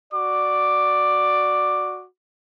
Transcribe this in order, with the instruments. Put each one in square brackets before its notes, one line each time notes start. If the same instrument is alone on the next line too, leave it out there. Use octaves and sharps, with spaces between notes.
[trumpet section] F#4 D5 D6